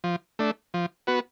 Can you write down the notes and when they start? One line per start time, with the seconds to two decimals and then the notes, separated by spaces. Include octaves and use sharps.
0.04 F3
0.39 A3 D4
0.74 F3
1.07 B3 F#4 B4